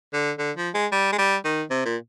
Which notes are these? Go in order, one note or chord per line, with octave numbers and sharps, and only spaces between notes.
D3
D3
F3
G#3
G3
G#3
G3
D#3
C3
A#2